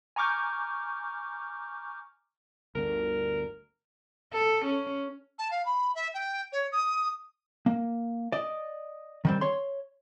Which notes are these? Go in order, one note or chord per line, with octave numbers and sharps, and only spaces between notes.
G#5 A#5 C#6 D6 F6 G6
G1 D2 D3 A#4
A4
C#4
A5
F5
B5
E5
G5
C#5
D#6
A#3
D5 D#5
D#3 G3 C4
C#5 C6